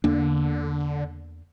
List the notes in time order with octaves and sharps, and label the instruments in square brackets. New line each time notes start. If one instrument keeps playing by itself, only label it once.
[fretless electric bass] E2 A#3 D4 [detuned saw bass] D3